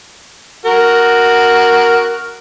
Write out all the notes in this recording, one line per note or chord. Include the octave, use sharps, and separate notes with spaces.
F#4 A#4